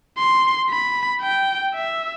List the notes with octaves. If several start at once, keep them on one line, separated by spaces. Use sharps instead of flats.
C6
B5
G5
E5